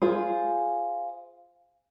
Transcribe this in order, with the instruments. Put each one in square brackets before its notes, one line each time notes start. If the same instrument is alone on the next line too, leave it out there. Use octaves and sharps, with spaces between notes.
[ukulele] F4 G#4 C5